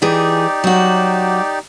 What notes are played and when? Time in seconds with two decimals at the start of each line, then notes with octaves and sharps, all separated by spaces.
0.02 E3 D#4 G4 G#4 D5
0.64 F#3 F#4